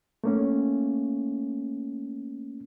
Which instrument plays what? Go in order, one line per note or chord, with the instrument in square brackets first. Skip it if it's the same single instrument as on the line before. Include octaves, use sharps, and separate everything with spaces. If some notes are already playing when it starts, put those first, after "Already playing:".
[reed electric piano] A3 A#3 C#4